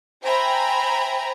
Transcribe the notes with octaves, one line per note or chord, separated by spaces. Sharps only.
C5 E5 G5 G#5 A#5 B5